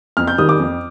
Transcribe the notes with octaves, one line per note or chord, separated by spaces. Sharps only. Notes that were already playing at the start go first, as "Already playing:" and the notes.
F2 F6
G6
D#3 G3 D#6
D6
F2